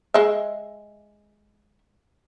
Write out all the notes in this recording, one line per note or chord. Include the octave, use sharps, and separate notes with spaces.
G#3 E5